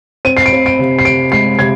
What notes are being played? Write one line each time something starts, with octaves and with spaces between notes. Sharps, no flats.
C4 D#7
C7
D7
C4
D7
C3
C7
C3 D7
G#3 C7
C3 G#6